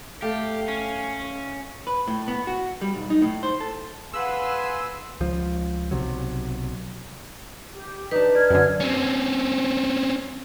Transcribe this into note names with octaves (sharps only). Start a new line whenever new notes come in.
A3 G4 F5
C#4
B4
A2
B3
F#4
G3
B1
D#4
A2
C5
A4
G#4 B4 F5 F#5 G#5 C6 E6
C#2 F3
B1 C3 F#3
G4
D4 D#4 B4
D5 F6 G#6
F#2 D3
C4 C#4